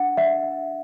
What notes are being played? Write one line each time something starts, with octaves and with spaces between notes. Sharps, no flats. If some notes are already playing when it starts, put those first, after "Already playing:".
Already playing: D4 F#5
E5